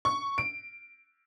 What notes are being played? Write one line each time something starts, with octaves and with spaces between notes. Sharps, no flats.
C#6
D7